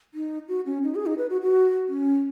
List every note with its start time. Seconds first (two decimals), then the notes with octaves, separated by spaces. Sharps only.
0.14 D#4
0.48 F#4
0.66 C#4
0.83 D#4
0.95 G#4
1.06 D#4
1.18 B4
1.30 F#4
1.42 F#4
1.89 C#4